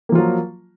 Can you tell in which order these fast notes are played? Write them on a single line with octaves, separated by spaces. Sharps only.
A#3 F3 F4 F#3